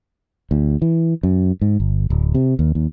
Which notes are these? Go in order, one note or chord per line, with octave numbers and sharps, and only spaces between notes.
D2
E3
F#2
G#2
G1
D1
C3
D#2
D#2